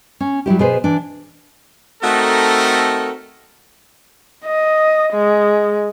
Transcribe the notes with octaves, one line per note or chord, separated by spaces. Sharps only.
C#4
F#3 G3 E4 G4
B2 B3 G#4 B4 C5
E3 D4
A3 C4 D#4 F#4 A4 A#4
D#5
G#3